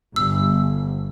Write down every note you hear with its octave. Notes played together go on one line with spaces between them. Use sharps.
G1 E6